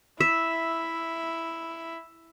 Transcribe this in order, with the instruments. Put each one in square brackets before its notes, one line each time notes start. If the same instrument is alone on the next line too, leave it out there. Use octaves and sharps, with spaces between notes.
[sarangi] E4 [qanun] E5